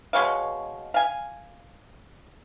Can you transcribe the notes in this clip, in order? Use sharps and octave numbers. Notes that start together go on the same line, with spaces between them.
B2 G#3 C#5 F5
F5 G#5